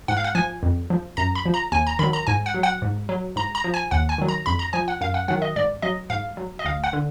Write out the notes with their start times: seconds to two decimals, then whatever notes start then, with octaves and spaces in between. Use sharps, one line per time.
0.08 G#2 F#5
0.17 F5
0.24 F#5
0.35 F3 G#5
0.63 F2
0.90 F3
1.17 F#2 A#5
1.35 B5
1.46 F3
1.54 A#5
1.72 D#2 G#5
1.87 A#5
1.99 D#3 F#3 B5
2.13 A#5
2.27 G#2 G#5
2.46 F#5
2.54 F#3
2.63 F#5
2.82 G#2
3.09 F#3
3.36 G#2 A#5
3.55 A#5
3.64 F3
3.74 G#5
3.91 D#2 F#5
4.09 G#5
4.18 D#3 F#3
4.28 A#5
4.46 F2 B5
4.59 A#5
4.73 F3 G#5
4.88 F#5
5.01 F#2 F5
5.14 F#5
5.28 D#3 F#3 F#5
5.42 D#5
5.56 G#2 D5
5.82 F#3 D#5
6.10 G#2 F5
6.37 F#3
6.59 D#5
6.65 D2 F5
6.84 F#5
6.93 D3